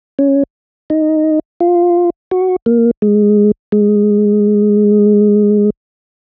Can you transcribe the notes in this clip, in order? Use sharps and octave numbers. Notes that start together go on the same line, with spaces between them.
C#4
D#4
F4
F#4
A#3
G#3
G#3